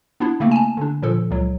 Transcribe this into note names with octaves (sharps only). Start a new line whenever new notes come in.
B3 D4 E4
C#3 A3 A#3 C4
G#5 A5
D3 D4
A#2 F3 A4
C#2 F#3